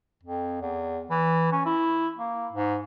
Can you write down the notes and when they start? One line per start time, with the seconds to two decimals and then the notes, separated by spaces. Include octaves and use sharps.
0.23 F2
0.62 E2
1.10 E3
1.52 C#4
1.66 E4
2.18 A#3
2.53 G#2